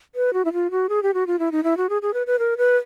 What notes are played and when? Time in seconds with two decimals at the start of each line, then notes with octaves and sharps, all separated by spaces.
0.15 B4
0.33 F#4
0.45 E4
0.53 F4
0.71 F#4
0.89 G#4
1.03 G4
1.14 F#4
1.27 F4
1.39 E4
1.52 D#4
1.64 E4
1.77 F#4
1.89 G#4
2.02 G#4
2.14 B4
2.27 B4
2.39 A#4
2.57 B4